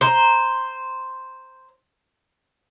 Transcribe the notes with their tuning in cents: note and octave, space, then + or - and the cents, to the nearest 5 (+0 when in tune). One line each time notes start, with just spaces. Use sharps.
C5 +0 A#5 +0